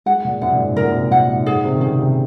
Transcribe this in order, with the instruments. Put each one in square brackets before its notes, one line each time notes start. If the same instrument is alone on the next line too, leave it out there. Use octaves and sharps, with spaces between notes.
[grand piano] G#3 [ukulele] F#5
[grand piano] A#2
[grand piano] F#2 [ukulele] F#5
[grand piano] A#2
G#2
[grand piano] A#2 [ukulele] A#4
[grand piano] C3
[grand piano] A#2 [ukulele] F#5
[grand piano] G#2
[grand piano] G#2 [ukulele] G#4
[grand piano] C3
D#3
[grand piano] C#3 [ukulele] G#4
[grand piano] C3